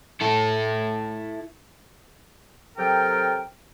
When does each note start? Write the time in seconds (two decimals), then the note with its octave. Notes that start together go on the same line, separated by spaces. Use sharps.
0.21 E4 A4
2.77 C3 F#3 A4 A#4 G5